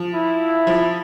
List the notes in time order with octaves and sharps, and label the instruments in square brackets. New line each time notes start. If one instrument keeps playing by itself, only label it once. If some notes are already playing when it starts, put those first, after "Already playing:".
Already playing: [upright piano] F3
[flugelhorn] E4
[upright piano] F3